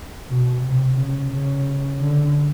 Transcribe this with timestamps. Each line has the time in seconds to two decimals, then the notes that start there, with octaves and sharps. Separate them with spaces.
0.28 B2
0.62 C3
0.97 C#3
1.31 C#3
1.99 D3